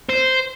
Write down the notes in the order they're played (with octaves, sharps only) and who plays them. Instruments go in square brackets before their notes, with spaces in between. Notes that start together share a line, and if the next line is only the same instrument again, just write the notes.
[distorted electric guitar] C5